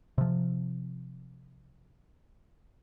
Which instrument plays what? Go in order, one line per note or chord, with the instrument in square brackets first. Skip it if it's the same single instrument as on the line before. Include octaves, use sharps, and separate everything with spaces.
[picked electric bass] C3 F3